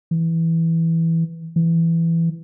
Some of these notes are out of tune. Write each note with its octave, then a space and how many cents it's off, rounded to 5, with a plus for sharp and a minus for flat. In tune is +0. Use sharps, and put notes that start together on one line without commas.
E3 -5
E3 +10